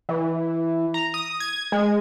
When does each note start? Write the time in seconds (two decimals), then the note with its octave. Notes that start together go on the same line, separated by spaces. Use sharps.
0.09 E3
0.94 A#5
1.14 D#6
1.40 G#6
1.72 G#3